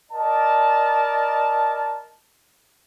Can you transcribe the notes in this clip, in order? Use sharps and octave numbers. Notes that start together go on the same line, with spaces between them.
A#4 D5 D#5 A5